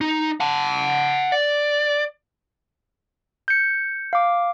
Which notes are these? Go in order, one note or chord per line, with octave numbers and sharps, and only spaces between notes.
D#4
F#5 A5
D5
G6 C#7
F5 D6